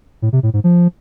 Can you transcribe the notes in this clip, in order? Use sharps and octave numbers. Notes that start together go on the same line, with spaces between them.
A2
C3
A2
G#2
F3